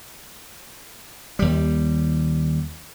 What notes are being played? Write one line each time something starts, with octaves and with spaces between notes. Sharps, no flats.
D#2 G3